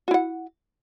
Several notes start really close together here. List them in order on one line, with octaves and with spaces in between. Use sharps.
F#4 E4 F#5